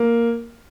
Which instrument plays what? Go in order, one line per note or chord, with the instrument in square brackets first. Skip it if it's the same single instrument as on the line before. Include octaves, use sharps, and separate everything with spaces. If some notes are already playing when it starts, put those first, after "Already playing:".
Already playing: [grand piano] A#3